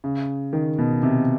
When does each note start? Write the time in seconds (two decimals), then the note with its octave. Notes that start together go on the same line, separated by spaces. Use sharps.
0.04 C#3
0.53 D#3
0.79 B2
1.03 C3